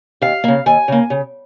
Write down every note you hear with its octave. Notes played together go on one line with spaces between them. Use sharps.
D#2 F5
C#3 A#3
D#2 G#5
C#3 A#3
C#3